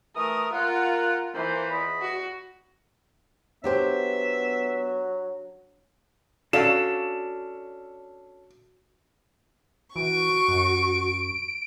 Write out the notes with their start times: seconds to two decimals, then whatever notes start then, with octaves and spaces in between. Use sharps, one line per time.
0.16 E3 A3 A#4 D#6
0.53 A#3 F4 A#4 F#5
1.34 E3 A#3 C5
1.70 E2 D#5 B5
2.01 F#4
3.64 F#3 B3 D4 G4 C5 E5
6.53 C#4 D4 F#4 A4 D5 F5 E7
9.96 E3 F#4 C#6 D7
10.48 F#2